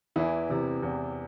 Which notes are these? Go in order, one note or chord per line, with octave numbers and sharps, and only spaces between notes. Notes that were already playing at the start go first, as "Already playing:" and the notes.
E2 E3 E4
C3 E3
E2